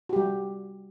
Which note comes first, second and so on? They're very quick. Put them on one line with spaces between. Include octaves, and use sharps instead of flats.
F#4 G4 G3